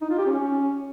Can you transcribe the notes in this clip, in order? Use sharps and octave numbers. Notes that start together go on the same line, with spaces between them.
D#4
F4
G4
C#4